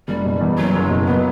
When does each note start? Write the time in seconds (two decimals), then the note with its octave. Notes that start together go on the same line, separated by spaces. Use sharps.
0.08 F#1 G3
0.24 B2
0.41 E2
0.57 F#1 F#3
0.74 F#1
0.90 B2
1.07 F#3 B3